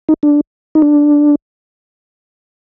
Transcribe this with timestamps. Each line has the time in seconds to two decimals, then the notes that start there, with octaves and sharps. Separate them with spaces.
0.09 D#4
0.23 D4
0.75 D#4
0.82 D4